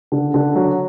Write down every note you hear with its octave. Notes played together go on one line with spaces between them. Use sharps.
D3
D3
F#3